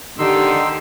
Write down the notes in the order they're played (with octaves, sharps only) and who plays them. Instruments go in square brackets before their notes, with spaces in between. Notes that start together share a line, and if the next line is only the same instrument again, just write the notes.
[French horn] D3 [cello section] D#3 G4 [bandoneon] D#4 C6 E6